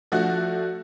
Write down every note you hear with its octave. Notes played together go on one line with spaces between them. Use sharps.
F3 A3 D4 F#4 F#5 F#6